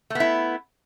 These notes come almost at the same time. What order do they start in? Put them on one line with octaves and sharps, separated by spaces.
A3 B3 E4